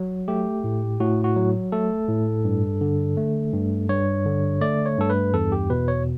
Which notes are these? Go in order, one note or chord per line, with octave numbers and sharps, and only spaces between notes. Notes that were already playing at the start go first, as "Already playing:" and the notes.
Already playing: F#3
A3 G4
A2
A2 F#4
F#4
F#3
A3 A4
A2
G2
D3
A3
G2
G2 C#5
D3
A3 D5
C#5
G2 A4
B4
E2 A4
G4
B2 B4
C#5